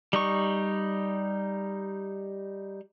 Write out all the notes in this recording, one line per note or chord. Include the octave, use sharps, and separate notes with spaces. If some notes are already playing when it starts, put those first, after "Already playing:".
G3 D#4 C#6